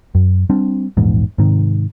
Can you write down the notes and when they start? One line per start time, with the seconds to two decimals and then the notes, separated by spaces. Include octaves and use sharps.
0.15 F#2
0.50 G3 C4 D4
0.97 A#1 E2 G#2
1.38 G#2 C3 D#3